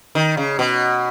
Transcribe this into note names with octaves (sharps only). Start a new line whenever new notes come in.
D#3
C#3
B2